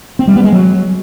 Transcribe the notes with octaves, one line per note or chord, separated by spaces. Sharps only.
C4
G3
B3
G#3
F#3